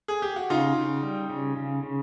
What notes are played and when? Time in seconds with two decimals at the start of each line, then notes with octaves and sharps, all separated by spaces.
0.08 G#4
0.22 G4
0.36 F#4
0.50 C#3 D#4 F4
0.76 C#3
1.03 G3
1.30 C#3
1.57 C#3
1.83 C#3